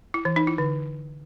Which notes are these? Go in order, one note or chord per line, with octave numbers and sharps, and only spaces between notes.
E4
E3
D#4
E4
D3